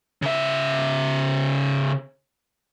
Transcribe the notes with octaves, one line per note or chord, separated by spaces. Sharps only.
C#3 E5